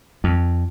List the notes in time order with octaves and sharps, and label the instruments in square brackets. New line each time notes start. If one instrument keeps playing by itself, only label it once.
[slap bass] F2